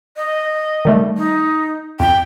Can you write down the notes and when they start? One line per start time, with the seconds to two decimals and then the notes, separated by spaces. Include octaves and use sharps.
0.17 D#5
0.85 D#3 G3 A3
1.17 D#4
2.00 F2 G5